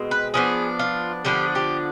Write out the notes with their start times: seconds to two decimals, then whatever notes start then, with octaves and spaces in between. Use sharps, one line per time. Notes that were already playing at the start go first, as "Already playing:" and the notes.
Already playing: B2 G#3 C4
0.11 B4
0.34 D3 F3 B3 D4 G#4
0.79 F4
1.25 D3 F3 B3 D4 G4
1.55 G4